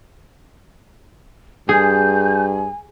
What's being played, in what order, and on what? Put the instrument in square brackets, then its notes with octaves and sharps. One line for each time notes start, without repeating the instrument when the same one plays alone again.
[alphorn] G2 [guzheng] G#4 [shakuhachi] G#5 [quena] G6